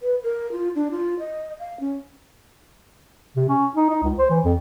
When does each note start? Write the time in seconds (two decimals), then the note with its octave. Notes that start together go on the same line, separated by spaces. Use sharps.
0.02 B4
0.23 A#4
0.52 F4
0.75 D4
0.91 F4
1.19 D#5
1.59 F5
1.80 C#4
3.36 C3
3.49 C#4
3.76 D#4
3.90 D#4
4.03 C#2
4.18 C5
4.30 E3
4.44 F2